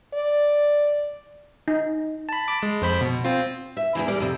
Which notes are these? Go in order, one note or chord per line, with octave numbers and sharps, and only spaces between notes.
D5
D#4
A5 B5
A5 B5 D6
G#3
F2 C5 B5
B2
C4 F4
E5
E2 G#2 E3
G3 A#4 D5
F2 C3